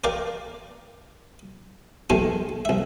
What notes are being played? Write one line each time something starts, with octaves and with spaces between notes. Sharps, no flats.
A#4 D5 F5 G5
B1 D#3 G#3 A3 G5 G#5
C2 E5